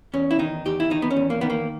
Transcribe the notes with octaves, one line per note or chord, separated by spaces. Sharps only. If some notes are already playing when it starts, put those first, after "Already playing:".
E2 C#4
E4
D#3 D#4
E2 G4
E4
D#3 D#4
B3
C#4
E2
A#3
D#3 B3
A#3